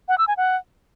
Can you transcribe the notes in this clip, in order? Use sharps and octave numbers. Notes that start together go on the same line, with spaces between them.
F#5
E6
G#5
F#5